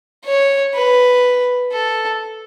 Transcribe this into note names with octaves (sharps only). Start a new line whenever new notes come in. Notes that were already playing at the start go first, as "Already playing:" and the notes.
C#5
B4
A4